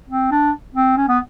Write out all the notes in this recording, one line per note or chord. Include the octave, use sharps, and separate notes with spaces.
C4
D4
C4
C#4
B3